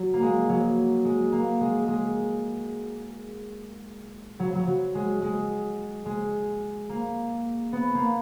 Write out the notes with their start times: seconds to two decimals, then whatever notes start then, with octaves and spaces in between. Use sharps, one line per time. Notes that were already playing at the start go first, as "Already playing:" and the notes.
Already playing: F#3
0.14 A#3
0.22 G#3
0.49 F#3
1.05 G#3
1.32 A#3
1.61 G#3
1.88 G#3
4.40 F#3
4.55 F#3
4.67 F#3
4.95 G#3
5.22 G#3
6.06 G#3
6.89 A#3
7.73 B3
7.95 A#3